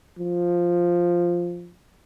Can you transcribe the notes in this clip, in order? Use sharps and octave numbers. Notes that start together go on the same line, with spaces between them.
F3